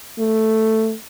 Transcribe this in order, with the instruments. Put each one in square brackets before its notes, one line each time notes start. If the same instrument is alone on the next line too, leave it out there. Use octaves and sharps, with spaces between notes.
[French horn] A3